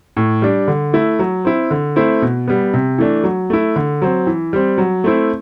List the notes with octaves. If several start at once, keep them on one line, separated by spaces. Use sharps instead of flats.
A2
G3 D4
D3
A3 E4
F#3
C4 E4
D3
A3 C4 E4
B2
G3 B3
C3
E3 A3 D4
F#3
A3 E4
D3
F#3 C4
E3
G3 C4
F#3
A3 C4 E4